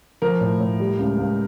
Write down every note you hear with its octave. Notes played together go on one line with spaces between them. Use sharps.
F3 A#4
A2
A2
G3
C#2
C#2